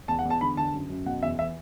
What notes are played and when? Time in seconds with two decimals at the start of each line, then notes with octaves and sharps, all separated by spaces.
0.08 E2 A5
0.19 F#5
0.25 E2
0.30 A5
0.41 D3 B5
0.57 D3 A5
0.73 F#2
0.90 F#2
1.06 B2 F#5
1.22 E2 E5
1.39 E3 E5